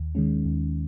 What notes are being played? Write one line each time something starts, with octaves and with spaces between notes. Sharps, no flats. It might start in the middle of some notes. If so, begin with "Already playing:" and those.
Already playing: D#2
D#3 G#3 C#4
D#2